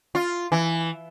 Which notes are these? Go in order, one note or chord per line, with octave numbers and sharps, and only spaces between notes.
F4
E3